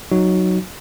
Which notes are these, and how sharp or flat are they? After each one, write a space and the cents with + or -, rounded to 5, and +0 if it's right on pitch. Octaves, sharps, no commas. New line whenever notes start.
F#3 +0 D#4 +0 F#4 +0